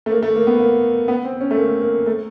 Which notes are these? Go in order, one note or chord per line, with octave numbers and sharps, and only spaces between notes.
A3
A#3
A3
A#3
B3
A#3
B3
C4
C#4
A3
A#3
A#3
A3